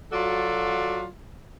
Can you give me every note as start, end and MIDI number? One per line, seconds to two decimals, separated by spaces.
0.12 1.05 54
0.12 1.05 65
0.12 1.05 66
0.12 1.05 69
0.12 1.05 74